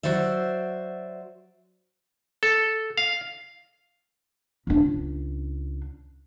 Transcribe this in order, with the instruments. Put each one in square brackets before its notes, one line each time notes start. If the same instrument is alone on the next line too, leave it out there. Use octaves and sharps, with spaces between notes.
[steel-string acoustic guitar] F#3 F#4 C5 D5 E5
[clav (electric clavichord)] A4
F5
[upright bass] C#2 D4